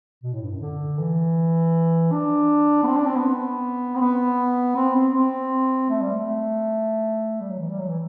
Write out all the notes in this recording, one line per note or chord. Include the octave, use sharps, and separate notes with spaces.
B2
A2
G2
F#2
D3
E3
D4
B3
C4
D4
C4
B3
C4
B3
C4
C4
C4
A3
G3
A3
G3
F#3
E3
G3
F#3
E3